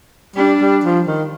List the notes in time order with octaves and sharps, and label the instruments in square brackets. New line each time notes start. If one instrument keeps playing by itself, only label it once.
[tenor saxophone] G3 [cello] D4
[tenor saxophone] G3
F3
D#3